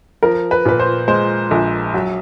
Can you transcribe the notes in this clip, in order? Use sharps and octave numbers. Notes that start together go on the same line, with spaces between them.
F3 A#4
B4
A#2 B4
C5
G#3 C5
A#1
F#3